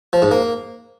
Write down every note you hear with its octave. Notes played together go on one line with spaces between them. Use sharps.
F3
G#2
A#3